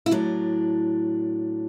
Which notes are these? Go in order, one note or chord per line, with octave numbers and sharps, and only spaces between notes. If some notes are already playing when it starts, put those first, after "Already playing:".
E4
A2 F#3 D4